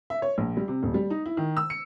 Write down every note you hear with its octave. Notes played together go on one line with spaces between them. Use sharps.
E5
C#5
A#1
G3
C3
D#1
G3
D#4
E4
D#3
E6
C#7